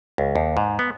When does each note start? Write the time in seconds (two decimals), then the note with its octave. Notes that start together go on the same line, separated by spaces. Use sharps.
0.18 C#2
0.36 D#2
0.57 G#2
0.79 B3